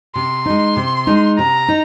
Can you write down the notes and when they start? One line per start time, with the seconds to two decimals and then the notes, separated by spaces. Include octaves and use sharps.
0.15 C3 C6
0.45 G#3 D#4
0.76 C3
1.07 G#3 D#4
1.38 C3 A#5
1.68 D#4